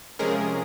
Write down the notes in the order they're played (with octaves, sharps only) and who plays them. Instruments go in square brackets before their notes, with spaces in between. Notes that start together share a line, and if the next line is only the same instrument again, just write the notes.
[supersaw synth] C3 F3 G#3 C#4 G#4 A#4